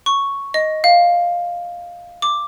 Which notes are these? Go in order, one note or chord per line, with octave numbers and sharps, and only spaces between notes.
C#6
D#5
F5
D6